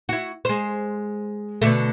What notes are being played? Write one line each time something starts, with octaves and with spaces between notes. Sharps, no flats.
E4 F#4
G#3 C5
B2 D3 A3